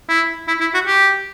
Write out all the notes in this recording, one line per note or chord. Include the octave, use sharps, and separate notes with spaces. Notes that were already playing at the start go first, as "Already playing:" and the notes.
E4
E4
E4
F#4
G4